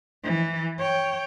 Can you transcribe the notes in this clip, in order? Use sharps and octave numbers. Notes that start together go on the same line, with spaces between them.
E3
C#5 G5